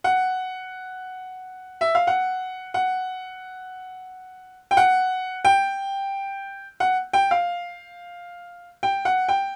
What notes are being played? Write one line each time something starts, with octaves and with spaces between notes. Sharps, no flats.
F#5
E5
F5
F#5
F#5
G5
F#5
G5
F#5
G5
F5
G5
F#5
G5